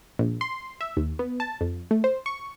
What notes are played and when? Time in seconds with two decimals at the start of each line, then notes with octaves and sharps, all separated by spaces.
0.19 A#1
0.41 C6
0.81 E5
0.97 D#2
1.19 B3
1.40 A5
1.61 F2
1.91 A3
2.04 C5
2.26 C#6